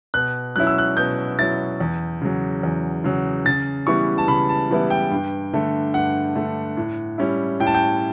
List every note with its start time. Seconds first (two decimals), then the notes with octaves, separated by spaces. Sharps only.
0.14 B2 F#6
0.56 F#3 C#4 E4 F#6
0.67 E6
0.78 F#6
0.97 B2 G6
1.39 F#3 C#4 E4 A6
1.80 E2
2.22 C#3 F#3
2.63 E2
3.04 C#3 F#3
3.46 C#3 A6
3.87 E3 G3 B3 E4 C#6
4.18 A5
4.28 C#3 B5
4.49 A5
4.70 E3 G3 B3 E4
4.90 G5
5.11 G2
5.53 D3 A3
5.94 G2 F#5
6.35 D3 A3
6.77 A2
7.18 G3 C#4 E4
7.60 A2 G5
7.67 A5
7.75 G5